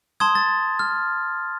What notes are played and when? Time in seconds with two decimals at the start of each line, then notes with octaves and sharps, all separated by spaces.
0.20 A5 C6 D#6 G#6
0.35 A6
0.79 F6